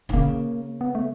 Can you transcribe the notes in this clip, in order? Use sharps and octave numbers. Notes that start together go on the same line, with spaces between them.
D3
C#3 A#3
B3
A3